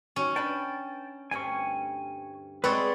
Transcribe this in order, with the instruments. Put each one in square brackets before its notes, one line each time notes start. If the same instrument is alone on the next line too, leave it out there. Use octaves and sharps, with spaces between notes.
[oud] D#2 F#3 F#4 [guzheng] C#4
[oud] D4 B4 [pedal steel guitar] G5 A5
[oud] D2 G2 C4 [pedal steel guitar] G#5 C#6
[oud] G#3 G#4 [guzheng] C4 C#5 F#5 [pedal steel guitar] B4 D5 C6